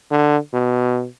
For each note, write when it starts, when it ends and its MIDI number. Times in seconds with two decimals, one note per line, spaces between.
0.11 0.37 50
0.53 1.06 47